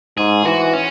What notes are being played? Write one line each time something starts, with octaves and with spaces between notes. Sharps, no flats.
G#2 G#4
E3 F#4
C#4